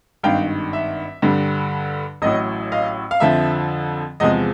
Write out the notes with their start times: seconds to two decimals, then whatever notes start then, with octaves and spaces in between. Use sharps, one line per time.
0.24 G#1 G2 D#3 F5 G5
0.73 E5
1.22 G2 D3 G3
2.22 A1 A2 F#3 D#5
2.72 D#5 F5
3.11 F5
3.20 F2 D3 F3 E5
4.20 E2 C3 F3 G#3 D#5